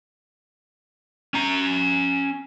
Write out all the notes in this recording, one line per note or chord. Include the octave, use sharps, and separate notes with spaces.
C#4 A#5